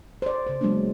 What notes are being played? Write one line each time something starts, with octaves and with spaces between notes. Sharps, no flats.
C5 D5
C#3 C5
F#3 G#3 A#3 B3 D4